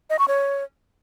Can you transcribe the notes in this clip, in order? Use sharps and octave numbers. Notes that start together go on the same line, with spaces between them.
D#5
C#6
C#5